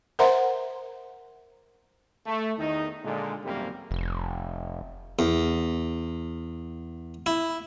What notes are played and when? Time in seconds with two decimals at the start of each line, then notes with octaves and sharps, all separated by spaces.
0.19 A#4 C5 E5 F#5 A#5 C6
2.26 A3
2.58 E2 D#3 D#4
3.04 A#2 D3 G#3
3.44 G#1 C#2 F#2 C3 G3 A#3
3.91 F1
5.19 E2
7.26 E4